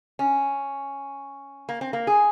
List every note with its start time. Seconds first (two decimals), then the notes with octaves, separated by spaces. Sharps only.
0.19 C#4
1.69 A#3
1.81 C4
1.93 A#3
2.07 G#4